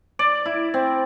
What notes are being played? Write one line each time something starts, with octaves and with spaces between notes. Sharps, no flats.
D5
E4
C4